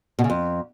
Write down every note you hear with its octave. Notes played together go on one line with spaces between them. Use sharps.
B2
C#3
F2